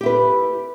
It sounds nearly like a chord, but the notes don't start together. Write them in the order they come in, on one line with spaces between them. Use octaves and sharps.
G4 E4 B4